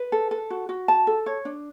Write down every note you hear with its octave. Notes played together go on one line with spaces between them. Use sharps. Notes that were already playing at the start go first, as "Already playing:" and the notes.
Already playing: B4
A4
A4
F#4
F#4
A5
A4
C#5
D4